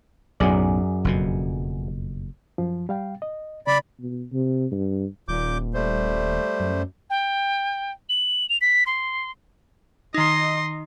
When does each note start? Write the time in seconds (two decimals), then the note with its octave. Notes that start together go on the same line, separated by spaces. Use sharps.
0.40 B1 F#2 A2 G#4 D5
1.04 F#1 F2 B2
2.58 F#2 F3
2.89 G3 F5 G5
3.22 D#5
3.67 C#3 D5 B5
4.00 B2
4.33 C3
4.72 G2
5.28 D#1 A#2 D6 G6
5.74 G3 A3 C5
6.60 F#2
7.10 G5
8.09 F#7
8.49 F7
8.61 B6
8.86 C6
10.14 D#3 D#4 D#5 C6